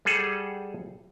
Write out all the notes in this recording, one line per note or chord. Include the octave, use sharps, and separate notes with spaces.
G3 G#4 A4 F#5